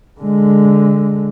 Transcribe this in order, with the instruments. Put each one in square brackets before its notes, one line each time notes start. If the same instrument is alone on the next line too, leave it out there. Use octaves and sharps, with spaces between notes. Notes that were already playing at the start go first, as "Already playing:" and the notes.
[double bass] D3 G#3